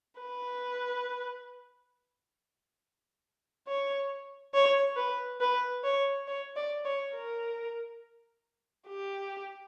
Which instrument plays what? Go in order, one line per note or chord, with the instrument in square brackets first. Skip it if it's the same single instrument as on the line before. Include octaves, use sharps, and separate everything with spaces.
[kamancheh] B4
C#5
C#5
B4
B4
C#5
C#5
D5
C#5
A#4
G4